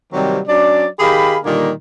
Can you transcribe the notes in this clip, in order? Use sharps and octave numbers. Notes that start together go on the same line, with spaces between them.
C3 D#3 F#3 G3 A#3 C4
F#3 C#4 D4 D5
D#3 G4 G#4 F5 B5
A#2 D3 D#3 G3 A#3